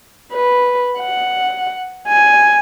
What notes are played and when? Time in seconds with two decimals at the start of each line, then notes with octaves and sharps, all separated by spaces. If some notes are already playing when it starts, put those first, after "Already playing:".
0.32 B4
0.99 F#5
2.07 G#5